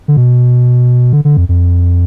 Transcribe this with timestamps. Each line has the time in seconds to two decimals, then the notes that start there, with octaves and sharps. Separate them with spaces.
0.08 D3
0.17 B2
1.13 D3
1.25 D3
1.37 F2
1.49 F2